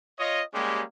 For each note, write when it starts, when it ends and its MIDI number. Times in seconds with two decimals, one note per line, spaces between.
0.19 0.42 65
0.19 0.42 73
0.19 0.42 75
0.53 0.82 55
0.53 0.82 56
0.53 0.82 58
0.53 0.82 61
0.53 0.82 67